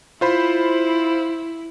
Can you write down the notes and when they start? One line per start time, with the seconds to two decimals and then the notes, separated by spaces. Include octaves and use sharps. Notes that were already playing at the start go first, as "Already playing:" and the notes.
0.21 E4 F4 C5 B5